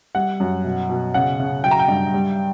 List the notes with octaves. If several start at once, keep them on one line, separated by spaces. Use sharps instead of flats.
G3 F#5
F#2
B2
B2
C#3 F#5
C#3
F#3 G5
A#5
G5
G2
G3